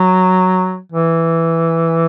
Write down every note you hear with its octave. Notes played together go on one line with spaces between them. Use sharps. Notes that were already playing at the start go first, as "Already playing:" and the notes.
Already playing: F#3
E3